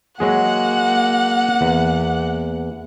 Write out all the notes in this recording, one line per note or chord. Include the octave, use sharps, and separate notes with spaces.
F#3 G#3 A#3 G#4 F#5
E2